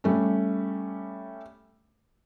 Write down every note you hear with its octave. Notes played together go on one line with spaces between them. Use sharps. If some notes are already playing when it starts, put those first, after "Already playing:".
G3 A3 C#4